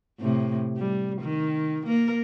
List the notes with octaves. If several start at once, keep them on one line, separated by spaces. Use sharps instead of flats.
A2 C3
G3
D#3
A#3 A#4